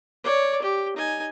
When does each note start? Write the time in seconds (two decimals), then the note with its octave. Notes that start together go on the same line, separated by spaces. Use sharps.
0.24 C#5 D5
0.62 G4
0.96 D#4 G#5